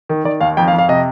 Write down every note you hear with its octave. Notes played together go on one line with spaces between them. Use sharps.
D#3
D#3 D5
D#2 F5
F2 G5
F5
F2
F5
C3 D#5